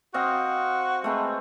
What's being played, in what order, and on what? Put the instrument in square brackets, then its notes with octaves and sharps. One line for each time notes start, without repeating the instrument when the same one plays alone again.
[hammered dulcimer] C4 D#5 F5 [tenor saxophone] F#4
[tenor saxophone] G#3 [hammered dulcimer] A3 C4 B4